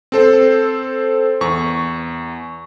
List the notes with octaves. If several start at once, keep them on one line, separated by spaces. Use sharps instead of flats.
C4 A4 C5
E2 C#6